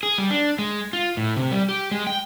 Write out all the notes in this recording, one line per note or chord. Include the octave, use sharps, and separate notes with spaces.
G#4
G3
D4
G#3
F4
A2
C3
G3
G4
G#3
G5